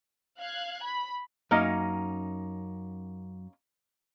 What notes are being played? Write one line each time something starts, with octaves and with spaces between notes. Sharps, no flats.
F5 F#6 G#6
B5
F#2 A#3 C#4 D#4